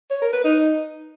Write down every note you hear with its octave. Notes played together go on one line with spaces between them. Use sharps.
C#5
A#4
B4
D#4